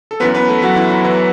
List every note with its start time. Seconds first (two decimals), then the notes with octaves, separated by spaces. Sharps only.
0.11 A4
0.20 F#2 E3 B3 B4
0.34 B3 B4
0.48 A3 A4
0.62 F#3 F#4
0.76 E3 E4
0.90 F#3 F#4
1.04 E3 E4